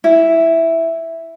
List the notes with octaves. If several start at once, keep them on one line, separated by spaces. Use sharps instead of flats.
E4